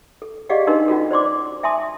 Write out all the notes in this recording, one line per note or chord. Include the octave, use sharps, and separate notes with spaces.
A4
G4 G#4 D5 D#5 F5 F#5
D4 D#4 A#4 B4 D#5 C6
C#4 F4 F#4 A4
C5 D5 C6 D6
E5 G#5 A5 C6 D#6